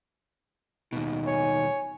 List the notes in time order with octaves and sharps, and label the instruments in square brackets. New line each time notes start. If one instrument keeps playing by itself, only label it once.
[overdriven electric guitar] D#2 B2 [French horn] D#4
[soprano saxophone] C#5 [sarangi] G#5